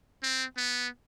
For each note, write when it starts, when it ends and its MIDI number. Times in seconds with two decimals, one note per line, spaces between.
0.23 0.45 60
0.57 0.88 59